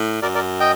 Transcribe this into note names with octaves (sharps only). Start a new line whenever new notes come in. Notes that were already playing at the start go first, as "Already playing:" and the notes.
Already playing: A2
F#2 A#4 D5
A#4 D5
D#5 G5